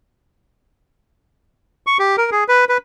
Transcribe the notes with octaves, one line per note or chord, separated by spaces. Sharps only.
C#6
G4
A#4
G#4
B4
B4